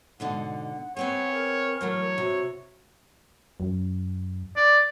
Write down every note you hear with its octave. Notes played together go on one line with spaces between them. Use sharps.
G#2 B2 D3 F#5
B3 C4 G#4 C#5 F#5
A#4
E3 F#3 A3 C#5
C3 F#4
F#2
D5